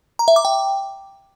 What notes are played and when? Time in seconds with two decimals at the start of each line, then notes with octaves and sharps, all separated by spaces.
0.19 A#5
0.28 E5
0.36 D6
0.45 G5